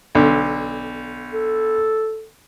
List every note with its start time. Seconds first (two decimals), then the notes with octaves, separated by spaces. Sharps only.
0.15 B1 D3
1.33 A4